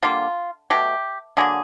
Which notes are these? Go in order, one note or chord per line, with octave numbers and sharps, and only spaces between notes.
D3 G3 A#3 F4
B2 F#3 A3 G4
D3 F#3 A#3 G#4